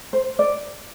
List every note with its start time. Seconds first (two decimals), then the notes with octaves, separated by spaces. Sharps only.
0.13 C5
0.39 D5